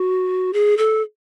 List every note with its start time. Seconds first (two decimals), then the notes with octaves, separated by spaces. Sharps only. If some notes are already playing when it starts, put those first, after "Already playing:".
Already playing: F#4
0.53 G#4
0.78 A4